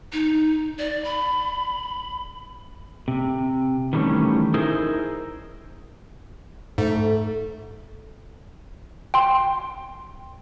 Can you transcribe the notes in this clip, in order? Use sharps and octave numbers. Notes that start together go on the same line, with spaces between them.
D#4
D5
B5
C3
D#3 E3 G3 A3 C#4
D#4 E4 G#4 A#4 C5
G#2 A3
G5 C6